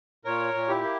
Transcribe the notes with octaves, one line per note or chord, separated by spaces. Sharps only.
A#2 A#4 C#5
A#2
E4 G4
A#3